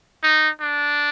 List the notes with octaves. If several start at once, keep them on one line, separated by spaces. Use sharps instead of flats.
D#4
D4